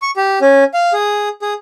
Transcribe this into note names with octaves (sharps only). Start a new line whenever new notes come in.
C#6
G4
C#4
F5
G#4
G#4